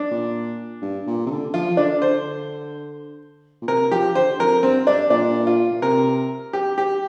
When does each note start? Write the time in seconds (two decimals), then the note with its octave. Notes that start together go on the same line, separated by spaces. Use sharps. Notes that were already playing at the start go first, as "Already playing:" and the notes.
Already playing: D4
0.11 A#2
0.82 G2
1.07 A#2
1.26 C3
1.30 D3
1.54 F3 F4
1.71 F3
1.77 D3 D4
2.02 D3 C5
3.62 A#2
3.68 C3 A#4
3.91 F3 G4
4.15 D3 C5
4.39 F2 A#4
4.63 G2 C4
4.87 G2 D4
5.10 A#2 D4
5.47 F4
5.71 A#2
5.82 C3 A#4
6.53 G4
6.78 G4